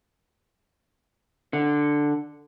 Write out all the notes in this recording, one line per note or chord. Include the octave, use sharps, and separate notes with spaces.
D3